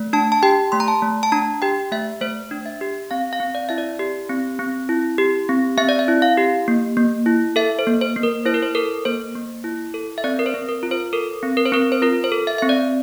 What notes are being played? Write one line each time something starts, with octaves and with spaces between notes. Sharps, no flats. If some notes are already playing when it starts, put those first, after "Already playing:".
Already playing: A3
D4 A5
A5
G4 G5
A3 C6
A#5
A5
A3
A5
D4 A#5
G4 G5
A3 E5
A3 C5
D4
E5
G4
C4 F5
F5
C4
D5
E4 E5
D5
G4
C4
C4
E4
G4
C4
C4 E5
D5
E5
E4
F5
G4
A#3
A#3
E4
A4 E5
C5
A#3
C5
A#3
A#4
E4 C5
A#4
C5
A4 A#4
A#3 C5
A#3
E4
A4
E5
C4 D5
A#4
C5
C4
A#4
F4
C5
A4 A#4
C4
A#4
C5
C4 A#4
C5
F4 A#4
C5
A4
E5
C4 E5
D5